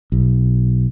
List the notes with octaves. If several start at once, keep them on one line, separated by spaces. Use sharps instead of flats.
B1